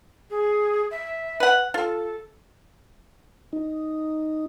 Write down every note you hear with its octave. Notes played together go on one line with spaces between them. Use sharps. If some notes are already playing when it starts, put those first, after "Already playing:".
G#4
E5
B4 F#5
F4 A4
D#4